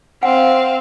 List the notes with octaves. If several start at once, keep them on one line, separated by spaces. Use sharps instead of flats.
C4 F5 F#5 G#5